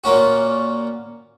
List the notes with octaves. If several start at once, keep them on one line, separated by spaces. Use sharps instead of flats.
A#2 A#3 C#4 F#4